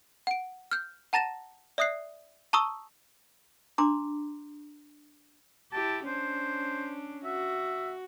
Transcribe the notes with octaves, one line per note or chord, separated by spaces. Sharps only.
F#5 D7
F6 G6
F#5 A5 A#5 A6 A#6 E7
D5 E5 D#6 F#6 C7
A5 A#5 C#6 D#6 E6 G7
D4 A#5 C6 D6
E4 G4 A5
C#4 D4 C5
F#4 E5